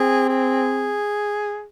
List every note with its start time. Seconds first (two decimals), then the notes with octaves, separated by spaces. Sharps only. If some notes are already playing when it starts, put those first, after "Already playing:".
Already playing: C4 G#4
0.29 G#4